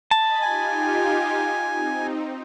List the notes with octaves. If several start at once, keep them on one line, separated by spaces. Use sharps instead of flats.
D#5 G#5 A5 B5
D#4 F4 G4 G#5
C4 D#4